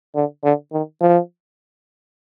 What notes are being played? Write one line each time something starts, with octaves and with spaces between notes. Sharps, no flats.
D3
D3
D#3
F3